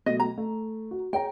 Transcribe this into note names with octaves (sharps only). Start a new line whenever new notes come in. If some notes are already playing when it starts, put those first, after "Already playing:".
B2 F#3 A3 D#5
A#5
A3
F#4
G#4 C#5 G5 A#5